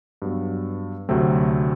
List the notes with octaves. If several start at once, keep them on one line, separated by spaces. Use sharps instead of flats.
G2 F#3 B3
D2 C3 F#3 A3 C4